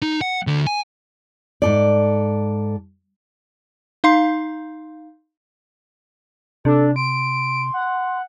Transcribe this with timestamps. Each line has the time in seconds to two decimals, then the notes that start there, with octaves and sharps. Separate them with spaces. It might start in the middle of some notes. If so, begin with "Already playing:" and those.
0.02 D#4
0.21 F#5
0.47 D2 D3
0.67 G#5
1.62 G#2 A4 D5
4.04 D#4 F5 C6 C7
6.65 C3 D4 A4
6.96 C6 D7
7.74 F#5